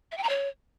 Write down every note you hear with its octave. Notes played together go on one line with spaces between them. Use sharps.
E5
G5
A#5
C#5